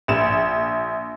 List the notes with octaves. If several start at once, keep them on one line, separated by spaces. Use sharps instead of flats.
A#1 E7